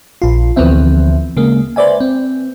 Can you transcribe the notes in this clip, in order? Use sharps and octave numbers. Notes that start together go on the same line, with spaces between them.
A#1 F4
D2 E3 F3 B3 C4 E5
C#3 G#3 A#3
B4 C5 D5 E5 G#5
C4